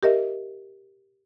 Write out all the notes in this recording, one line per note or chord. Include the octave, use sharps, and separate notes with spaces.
G4 A#4 D#5 E5